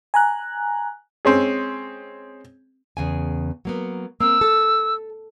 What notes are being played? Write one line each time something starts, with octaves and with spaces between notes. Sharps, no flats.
G#5 A#5 F#6
G#3 C4 C#4 G#4
E2 C#3 G#5
F#3 A#3 B3
A#3 C4 E6
A4